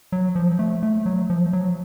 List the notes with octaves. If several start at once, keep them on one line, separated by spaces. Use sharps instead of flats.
F#3
F3
A3
A3
F#3
F3
F#3